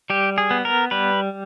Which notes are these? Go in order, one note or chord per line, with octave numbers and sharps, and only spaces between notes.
G3 G4
G#4
B3
A#4
G3 B4